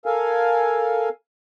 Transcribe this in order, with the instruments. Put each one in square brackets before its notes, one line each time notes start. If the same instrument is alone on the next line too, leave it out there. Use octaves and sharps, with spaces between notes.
[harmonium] A4 A#4 F5 G#5